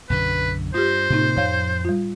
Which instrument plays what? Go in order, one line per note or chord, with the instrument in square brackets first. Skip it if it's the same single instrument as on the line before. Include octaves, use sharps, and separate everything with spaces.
[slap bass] B1 F#2 D3 [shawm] B4
[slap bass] G2 [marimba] F4 G4 [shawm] C5
[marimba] A2 D#4 [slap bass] C3 A#3
[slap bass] F2 [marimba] C#5 F5
[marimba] G3 F4